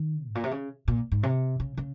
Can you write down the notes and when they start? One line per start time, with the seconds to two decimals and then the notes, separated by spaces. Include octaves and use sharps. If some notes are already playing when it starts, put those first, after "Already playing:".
Already playing: D#3
0.27 G#2
0.35 A#2
0.44 C3
0.51 C#3
0.88 A#2
1.12 G#2
1.23 C3
1.60 C#3
1.77 C#3